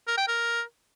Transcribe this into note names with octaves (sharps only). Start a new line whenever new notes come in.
A#4
G5
A#4